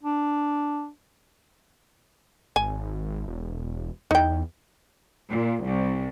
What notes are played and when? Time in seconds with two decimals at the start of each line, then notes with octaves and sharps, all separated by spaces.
0.03 D4
2.56 G#1 G#5
3.27 E1
4.11 E2 D#4 G5
5.31 A#2
5.64 C2